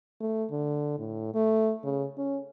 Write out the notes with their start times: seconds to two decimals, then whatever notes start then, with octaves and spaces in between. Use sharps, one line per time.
0.21 A3
0.51 D3
0.98 A2
1.34 A3
1.84 C#3
2.17 C#4